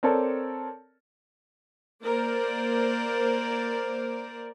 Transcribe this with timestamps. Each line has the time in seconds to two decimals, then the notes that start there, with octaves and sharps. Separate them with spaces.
0.03 C4 A4 A#4 C#5 D5 A5
2.03 A#3 A#4 C5 D5